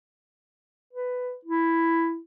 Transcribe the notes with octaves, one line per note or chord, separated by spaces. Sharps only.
B4
E4